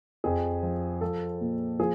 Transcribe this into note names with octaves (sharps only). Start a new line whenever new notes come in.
F2 G#4
F3
F3 A4
A#2
F3 G#4